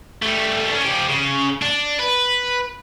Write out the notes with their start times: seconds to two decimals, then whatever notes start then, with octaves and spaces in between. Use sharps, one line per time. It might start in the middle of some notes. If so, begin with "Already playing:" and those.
0.23 G3 A3
0.71 C#4 D4
0.85 F3 G4
1.08 C#3
1.62 D4
1.99 B4